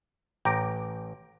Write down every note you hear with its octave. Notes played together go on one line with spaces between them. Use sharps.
A1 G5 A#5 D6